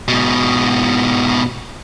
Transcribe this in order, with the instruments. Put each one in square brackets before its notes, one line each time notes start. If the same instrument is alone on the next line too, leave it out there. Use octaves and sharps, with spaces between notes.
[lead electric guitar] G#2 B2